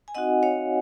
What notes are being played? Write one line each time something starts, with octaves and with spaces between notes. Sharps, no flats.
G#5
C4 D#4 F#4 D#5 F#5
C#5 F5